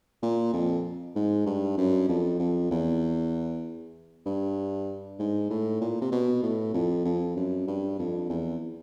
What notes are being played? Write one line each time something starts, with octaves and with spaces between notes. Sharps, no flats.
A#2
F2
G#2
G2
F#2
F2
F2
E2
G2
G#2
A2
A#2
C3
B2
A2
F2
F2
F#2
G2
F2
E2